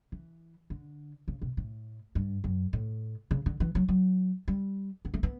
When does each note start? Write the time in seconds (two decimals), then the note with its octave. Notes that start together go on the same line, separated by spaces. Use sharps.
0.12 E3
0.70 D3
1.28 C#3
1.42 B2
1.57 A2
2.15 G2
2.44 F#2
2.73 A2
3.31 C#3
3.46 D3
3.60 E3
3.75 F#3
3.88 F#3
4.48 G3
5.05 B3
5.14 A3
5.23 B3